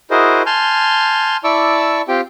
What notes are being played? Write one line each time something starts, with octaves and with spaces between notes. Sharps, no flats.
E4 F#4 G#4 A#4 C5 D#5
G#5 A5 C6 F6 G6
E4 D5 A5 C#6 D6 E6
C4 F4 G4 G5